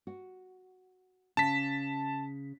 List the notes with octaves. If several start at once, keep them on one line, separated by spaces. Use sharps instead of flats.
F#4
C#3 A5 B6